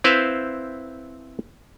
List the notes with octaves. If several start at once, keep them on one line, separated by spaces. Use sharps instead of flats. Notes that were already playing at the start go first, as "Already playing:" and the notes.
C4 E4 B4 C5 E5 F5